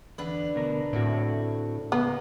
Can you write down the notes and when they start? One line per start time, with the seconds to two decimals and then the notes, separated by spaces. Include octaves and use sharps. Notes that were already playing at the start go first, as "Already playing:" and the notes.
0.18 E2 D3 D4 B4
0.55 D2 B2 A#4
0.93 A2 C4 F#4
1.92 C#2 A#3 B3